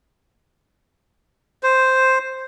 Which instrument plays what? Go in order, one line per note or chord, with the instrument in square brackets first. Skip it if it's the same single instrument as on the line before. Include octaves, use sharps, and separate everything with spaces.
[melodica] C5